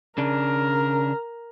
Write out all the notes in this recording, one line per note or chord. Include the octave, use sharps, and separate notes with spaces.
C#3 D4 A#4